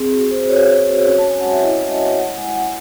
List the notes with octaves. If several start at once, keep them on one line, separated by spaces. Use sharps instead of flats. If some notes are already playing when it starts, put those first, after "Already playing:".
Already playing: C4 G#4
F#4 G#4
C4 C5
F#4 C#5
C4
F#4
C#4
A5
C#4 G#5
G#3 F#5
E5
E4 D#5
E4 E5
D#5
E4
G#3 F#5
G#3 G#5
G#3 F#5